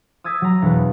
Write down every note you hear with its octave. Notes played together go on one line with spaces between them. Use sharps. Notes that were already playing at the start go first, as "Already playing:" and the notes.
D#6 E6 G#6 A6 B6
F#3 A#5
E1 B4